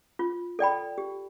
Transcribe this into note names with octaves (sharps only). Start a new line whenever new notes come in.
F4
A4 D5 G5 B5
G4